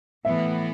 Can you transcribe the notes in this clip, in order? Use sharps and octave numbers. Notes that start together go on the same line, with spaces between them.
A2 E3 B3 E5